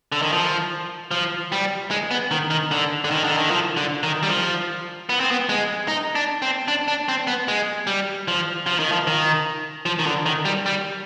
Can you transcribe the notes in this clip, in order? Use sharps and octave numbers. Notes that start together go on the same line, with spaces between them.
D3
D#3
F3
F3
G3
G#3
B3
D#3
D#3
D3
D3
D#3
D3
D#3
F3
D3
D#3
G3
F3
B3
C4
B3
G#3
D#4
D4
C4
D4
D4
C4
B3
G#3
G3
F3
F3
D#3
F3
D#3
F3
D#3
D3
D#3
G3
G3